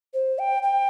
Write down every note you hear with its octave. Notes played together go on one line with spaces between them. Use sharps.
C5
G5
G5